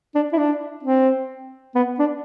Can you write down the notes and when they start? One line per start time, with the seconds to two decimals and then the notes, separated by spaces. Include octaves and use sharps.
0.15 D4
0.32 E4
0.37 D4
0.83 C4
1.75 B3
1.99 D4